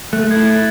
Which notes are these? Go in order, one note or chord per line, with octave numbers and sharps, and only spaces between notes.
A3 F#6
G#6
E4
A6